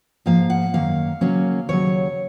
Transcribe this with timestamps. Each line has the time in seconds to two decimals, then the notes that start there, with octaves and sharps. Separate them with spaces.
0.26 G#2 F3 A#3 F5
0.50 F#5
0.73 F#2 D#3 A#3 F5
1.21 C#3 F#3 A#3 C#4
1.68 D#2 C#3 F#3 C#5